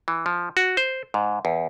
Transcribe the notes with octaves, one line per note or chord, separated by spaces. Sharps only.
E3
F3
F#4
C5
G#2
E2